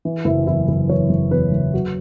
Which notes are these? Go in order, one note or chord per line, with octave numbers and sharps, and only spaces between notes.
E3
F#1 E4
E2 E4
F#1 E4
E3 C#5
F#1
E2 B4
F#1
F#3 F#4